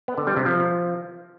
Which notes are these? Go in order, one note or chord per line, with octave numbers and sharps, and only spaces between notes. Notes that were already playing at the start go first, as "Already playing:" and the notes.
B3
D3
G3
C3
F3